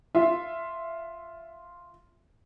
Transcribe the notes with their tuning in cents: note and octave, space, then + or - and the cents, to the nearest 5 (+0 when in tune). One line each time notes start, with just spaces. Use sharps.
F4 +0 E5 +10